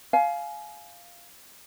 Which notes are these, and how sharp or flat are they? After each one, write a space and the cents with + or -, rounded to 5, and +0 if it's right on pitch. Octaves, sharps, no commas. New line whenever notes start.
F5 +0 G#5 +30